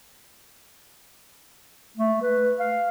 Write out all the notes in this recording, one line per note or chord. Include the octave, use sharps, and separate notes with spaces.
A3
B4
F5